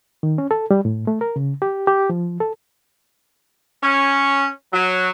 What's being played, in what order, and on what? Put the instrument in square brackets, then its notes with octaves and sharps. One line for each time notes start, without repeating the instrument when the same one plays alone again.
[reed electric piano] D#3
C#4
A4
G3
A2
A3
A#4
C#3
G4
G4
F3
A4
[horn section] C#4
F#3